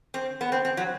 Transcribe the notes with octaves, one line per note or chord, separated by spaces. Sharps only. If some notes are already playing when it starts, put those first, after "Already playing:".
C4
B3
C4
C4
F#3